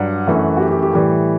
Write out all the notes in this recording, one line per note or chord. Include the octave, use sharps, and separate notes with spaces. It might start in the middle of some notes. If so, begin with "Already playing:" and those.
Already playing: G2 F#3 F#5
F#2 E3 A3
F#4
G4
G4
G4
A2 E3 G3